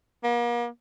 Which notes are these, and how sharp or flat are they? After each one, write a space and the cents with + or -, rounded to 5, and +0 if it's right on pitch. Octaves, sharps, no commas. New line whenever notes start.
A#3 +40